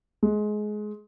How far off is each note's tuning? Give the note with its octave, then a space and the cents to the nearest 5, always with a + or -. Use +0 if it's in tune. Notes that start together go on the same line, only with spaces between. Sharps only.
G#3 +20